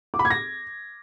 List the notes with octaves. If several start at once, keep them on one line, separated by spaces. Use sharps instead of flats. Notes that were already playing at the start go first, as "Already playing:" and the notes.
D6
B5
G#6
A#6